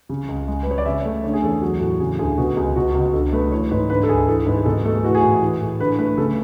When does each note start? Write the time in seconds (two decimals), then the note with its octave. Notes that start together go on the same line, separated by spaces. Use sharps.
0.09 C#3
0.29 C#2
0.48 G#3
0.63 B4
0.67 G#3 C#5
0.78 D5
0.86 C#3 E5
1.05 A3
1.24 D3 C#5
1.33 G#4
1.43 E2 A4
1.62 F#3 F#4
1.81 A2 F#4
1.99 C#3 G#4
2.19 D2 G#4
2.38 B2 F#4
2.56 C#2 G#4
2.76 B2 F#4
2.95 C#2 F#4
3.13 D3 A4
3.33 A3 B4
3.51 E3 C#5
3.71 G#2 B4
3.90 D3 B4
4.03 A4
4.08 D2 G#4
4.28 E3 A4
4.46 G#2 B4
4.57 G#4
4.65 B2 A4
4.85 A3 A4
4.95 G#4
5.04 E3 F#4
5.15 G#4
5.23 A2
5.42 E3
5.61 A2
5.80 D3 B4
5.99 A3 B4
6.18 C#3 A4